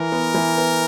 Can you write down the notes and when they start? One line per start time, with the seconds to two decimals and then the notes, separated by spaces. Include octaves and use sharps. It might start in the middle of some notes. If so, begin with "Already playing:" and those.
Already playing: E3 A#4
0.12 B3
0.35 E3
0.58 B3